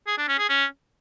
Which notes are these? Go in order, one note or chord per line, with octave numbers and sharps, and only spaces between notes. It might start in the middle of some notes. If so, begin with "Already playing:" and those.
G#4
D4
C#4
G#4
C#4